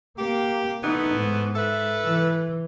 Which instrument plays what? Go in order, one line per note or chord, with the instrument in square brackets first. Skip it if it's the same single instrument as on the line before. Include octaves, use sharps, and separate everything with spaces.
[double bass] A#3 [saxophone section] G4
[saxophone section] E3 A3 B3 [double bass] D#4
[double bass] G#2
[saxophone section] A4 B4 E5
[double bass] E3